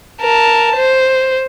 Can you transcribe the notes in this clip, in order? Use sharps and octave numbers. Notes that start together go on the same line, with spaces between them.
A#4 A5
C5